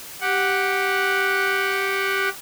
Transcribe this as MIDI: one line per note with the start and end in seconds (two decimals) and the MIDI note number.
0.21 2.29 67
0.21 2.29 78